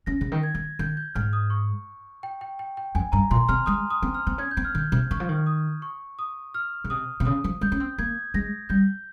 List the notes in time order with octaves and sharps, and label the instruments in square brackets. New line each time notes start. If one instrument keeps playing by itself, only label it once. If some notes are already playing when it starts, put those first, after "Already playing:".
[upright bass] C#4 [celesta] A#6
[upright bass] C#3
D#3
[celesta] G#6
[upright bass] D#3
[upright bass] D#3 [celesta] G6
[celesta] G6
[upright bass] G#2 [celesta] F6
[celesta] D#6
C#6
G5
G5
G5
G5
[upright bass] F2 [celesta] G#5
[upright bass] G2 [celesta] A#5
[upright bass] A#2 [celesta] C6
[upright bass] C3 [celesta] F6
[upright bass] G#3 [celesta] D#6
[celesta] D#6
[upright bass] C4
[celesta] F6
[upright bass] C4
[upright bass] C#4 [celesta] G#6
[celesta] G6
[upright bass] C4
[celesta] F6
[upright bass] D#3
[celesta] G6
[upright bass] C3
[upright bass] D#3 [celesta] C#6
[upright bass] F3
D#3
[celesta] D#6
C#6
D#6
F6
[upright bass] C#3
[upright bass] C3 [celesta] D#6
[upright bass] C3
[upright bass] C#3 [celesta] D#6
[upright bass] F3
[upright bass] G#3 [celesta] G6
[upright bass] C#4
C4
[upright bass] A#3 [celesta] G#6
[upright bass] G#3 [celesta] A#6
[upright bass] G3 [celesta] G6